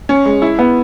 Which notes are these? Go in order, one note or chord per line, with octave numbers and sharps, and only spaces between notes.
C#4
G#3
E4
B3